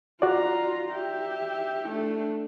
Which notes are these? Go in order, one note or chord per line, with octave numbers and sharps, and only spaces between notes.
F4 F#4 D5 A#5
G4 E5
A3 D4